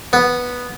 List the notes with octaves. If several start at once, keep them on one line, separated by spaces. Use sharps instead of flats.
B3